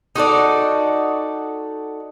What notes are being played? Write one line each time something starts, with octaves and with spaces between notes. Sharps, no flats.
D#4 F#4 A4 D5